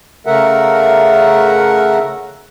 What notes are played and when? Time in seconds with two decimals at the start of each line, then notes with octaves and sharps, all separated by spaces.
0.26 C#3 A3 A#4 E5 F#5